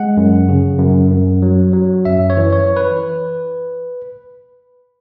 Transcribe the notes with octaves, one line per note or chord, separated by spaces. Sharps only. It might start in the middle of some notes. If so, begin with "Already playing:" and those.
Already playing: G#3 F#5
F#2
C#3
F#2
F#2
F#3
F#3
F#2 E5
C#5
E3
C#5
B4